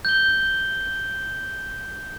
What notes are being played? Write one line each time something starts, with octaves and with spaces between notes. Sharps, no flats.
G6 G7